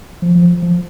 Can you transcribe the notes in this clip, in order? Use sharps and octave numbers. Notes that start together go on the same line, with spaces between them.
F3
F3
F3